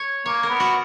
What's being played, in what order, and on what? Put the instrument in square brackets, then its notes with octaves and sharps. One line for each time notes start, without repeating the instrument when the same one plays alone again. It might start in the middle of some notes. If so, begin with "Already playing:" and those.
Already playing: [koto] C#5
[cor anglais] A#3 [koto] C#5
[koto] A#4
[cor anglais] B3
[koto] F#4